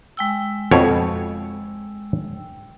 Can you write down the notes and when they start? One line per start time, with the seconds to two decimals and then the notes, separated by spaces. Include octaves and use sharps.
0.17 G#3 G5 E6
0.71 F2 B2 C#5